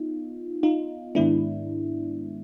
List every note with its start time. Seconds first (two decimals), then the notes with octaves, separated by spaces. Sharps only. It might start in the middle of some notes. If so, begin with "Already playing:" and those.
Already playing: B3 D#4 F4
0.63 D#4 F4
1.15 G#2 D#3 G#3 B3 D4 E4